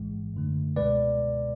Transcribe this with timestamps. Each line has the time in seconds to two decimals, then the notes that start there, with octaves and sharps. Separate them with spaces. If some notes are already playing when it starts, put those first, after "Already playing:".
Already playing: A1 G#2 E3 G#3
0.34 F#2 D3 A3
0.76 C#2 B2 G#3 B4 D5